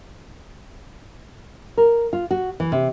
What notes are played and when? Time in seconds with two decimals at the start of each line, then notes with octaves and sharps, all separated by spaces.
1.77 A#4
2.13 F4
2.31 F#4
2.60 E3
2.72 C3